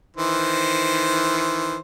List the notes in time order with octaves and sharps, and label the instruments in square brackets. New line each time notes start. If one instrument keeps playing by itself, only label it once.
[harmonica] D#3 E3 C5